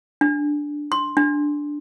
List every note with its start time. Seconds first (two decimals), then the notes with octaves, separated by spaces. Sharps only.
0.21 D4
0.92 C6
1.17 D4